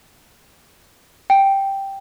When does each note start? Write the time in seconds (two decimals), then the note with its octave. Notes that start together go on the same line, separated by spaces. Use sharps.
1.30 G5